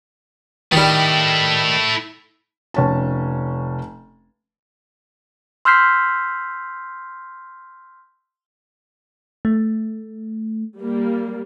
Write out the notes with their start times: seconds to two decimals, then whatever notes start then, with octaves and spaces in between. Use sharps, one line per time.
0.72 D#3 G3 A3 E4
2.74 F1 C#4 A5
5.65 C6 E6 F6 G6 B6 C7
9.45 A3
10.80 G3 A#3